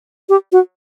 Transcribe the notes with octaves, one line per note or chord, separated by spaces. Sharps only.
G4
F#4